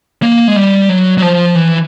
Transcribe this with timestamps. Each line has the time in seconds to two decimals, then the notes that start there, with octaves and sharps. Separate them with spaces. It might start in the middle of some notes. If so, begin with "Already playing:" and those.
0.23 A#3
0.48 G#3
0.56 G3
0.89 F#3
1.18 F#3
1.22 F3
1.55 E3